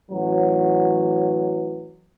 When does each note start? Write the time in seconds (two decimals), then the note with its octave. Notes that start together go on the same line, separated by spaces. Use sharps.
0.11 A1 E3 F#3